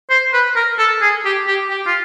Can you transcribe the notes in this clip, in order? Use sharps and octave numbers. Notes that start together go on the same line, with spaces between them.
C5
B4
A#4
A4
G#4
G4
G4
G4
F4